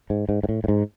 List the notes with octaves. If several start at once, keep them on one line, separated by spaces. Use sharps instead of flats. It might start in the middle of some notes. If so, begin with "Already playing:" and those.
G#2
G#2
G#2
A2
A2
G#2